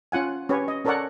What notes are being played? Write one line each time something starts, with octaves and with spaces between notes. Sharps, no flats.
C#4 F4 F#5 G#5
C#4 G4 B4 C#5
D#5
C#4 A4 A#4 C#5 D5 F#5